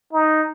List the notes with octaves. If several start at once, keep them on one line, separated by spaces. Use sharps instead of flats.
D#4